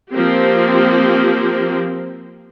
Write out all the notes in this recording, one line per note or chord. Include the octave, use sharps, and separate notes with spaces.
F3 A#3 C4 G4